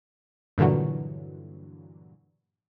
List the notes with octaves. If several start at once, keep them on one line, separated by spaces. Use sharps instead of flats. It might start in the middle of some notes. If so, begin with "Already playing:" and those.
G2 A#2 D3 E3 F#3